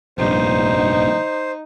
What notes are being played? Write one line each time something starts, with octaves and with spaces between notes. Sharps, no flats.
F1 A#1 G2 D#4 C5